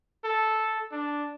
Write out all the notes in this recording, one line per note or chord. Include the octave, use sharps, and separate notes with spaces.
A4
D4